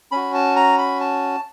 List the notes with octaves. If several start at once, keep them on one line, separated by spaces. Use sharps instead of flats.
C#4 F#4 B5
A5
A#5
B5
A5